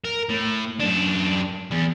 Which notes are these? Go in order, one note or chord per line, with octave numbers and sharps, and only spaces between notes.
A#4
A2
F#2 D4
E2